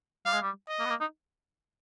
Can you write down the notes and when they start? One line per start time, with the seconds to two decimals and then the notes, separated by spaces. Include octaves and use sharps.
0.26 G3 F5
0.33 G#3
0.41 G3
0.69 D#5
0.80 A#3
0.85 B3
0.90 A#3
1.00 D#4